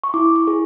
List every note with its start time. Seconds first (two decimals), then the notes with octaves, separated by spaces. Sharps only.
0.04 C#6
0.14 E4 D6
0.36 C#6
0.47 G#4